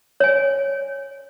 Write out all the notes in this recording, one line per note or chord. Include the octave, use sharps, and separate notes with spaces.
C#5 G#5